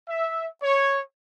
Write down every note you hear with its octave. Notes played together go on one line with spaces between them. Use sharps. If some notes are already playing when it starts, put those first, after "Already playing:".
E5
C#5